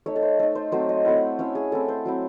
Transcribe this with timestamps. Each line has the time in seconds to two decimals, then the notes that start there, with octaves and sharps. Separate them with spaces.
0.06 A3 D#4 C#5
0.16 A4
0.22 C5
0.39 A3 D#4 A4
0.55 C5
0.72 F#3 A3 C4 C5
0.89 D#5
1.05 A3 C4 E4 F#5
1.39 A3 C#4 E4 C#5
1.55 G#4
1.72 A3 C4 E4 A4
1.88 C5
2.05 F#3 C4 E4